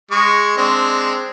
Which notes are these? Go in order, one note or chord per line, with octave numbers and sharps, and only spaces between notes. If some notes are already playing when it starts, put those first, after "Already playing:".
G#3 C#6
G#3 C4 D4